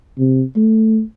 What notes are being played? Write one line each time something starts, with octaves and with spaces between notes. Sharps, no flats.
C3
A3